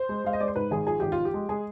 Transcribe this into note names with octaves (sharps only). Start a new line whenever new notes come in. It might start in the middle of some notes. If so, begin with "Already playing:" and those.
Already playing: C5
G#3
G#3 F5
D#5
G#3 D5
C5
G#2 B4
G#1 G#4
F3 G#4
G#1 G4
F4
F3
G4
G#3
G#3 G#4